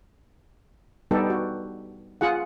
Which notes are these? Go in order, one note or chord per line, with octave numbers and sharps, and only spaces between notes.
G3 B3 D#4 G4 A4
F#4
F4 G#4 F#5